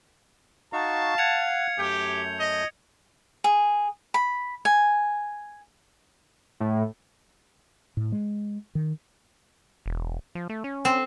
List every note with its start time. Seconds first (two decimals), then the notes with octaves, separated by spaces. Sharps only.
0.73 D#4 F#4 F5 A5 C#6
1.18 F#5 G#6 C#7 F7
1.78 F#2 A3 G4 G6
2.39 D#5
3.44 G#4
4.14 B5
4.65 G#5
6.60 A2
7.97 A2
8.12 G#3
8.75 D#3
9.86 E1
10.35 F3
10.49 A3
10.64 C#4
10.85 C4